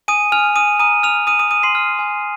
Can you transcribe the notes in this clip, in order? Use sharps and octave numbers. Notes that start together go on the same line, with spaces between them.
G#5 D#6 D#7
G#5 F6 F7
G#5 D#6 D#7
A#5 D#6 D#7
D#6 F6 F7
D#6 D#7
D#6 D#7
D#6 D#7
C6 C7
F6
G#5